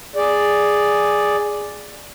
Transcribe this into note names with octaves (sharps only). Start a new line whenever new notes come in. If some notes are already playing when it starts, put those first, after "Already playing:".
G#4 D5